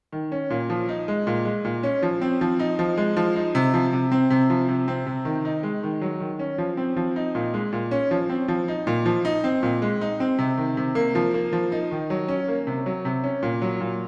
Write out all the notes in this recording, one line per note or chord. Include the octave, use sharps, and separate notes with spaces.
D#3
C#4
A#2
F3
D#4
G#3
A#2
G#3
A#2
C#4
F3
C4
F3
D#4
F3
G#3
F3
D#4
C3
F3
C3
C4
C3
F3
C3
C4
C3
D#3
D#4
G#3
D#3
F#3
D#3
C#4
F3
C4
F3
D#4
A#2
G#3
A#2
C#4
F3
C4
F3
D#4
A#2
F3
D#4
C4
A#2
G#3
D#4
C4
C3
D#3
C3
A#3
F3
A#3
F3
D#4
D#3
F#3
C#4
A#3
C3
F#3
C3
C#4
A#2
F#3
A#2